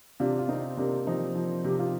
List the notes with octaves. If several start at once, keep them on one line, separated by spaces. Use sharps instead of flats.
C3 D4 F4
F4
C3 C4 D#4
C3 A#3 D4
F3 C4 D#4
F3
C3 G4
F4